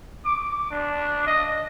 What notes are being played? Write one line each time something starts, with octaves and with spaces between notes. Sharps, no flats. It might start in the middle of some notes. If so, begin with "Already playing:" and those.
D6
D4
D#5